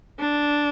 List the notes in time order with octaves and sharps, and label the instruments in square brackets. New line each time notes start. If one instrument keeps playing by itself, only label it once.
[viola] D4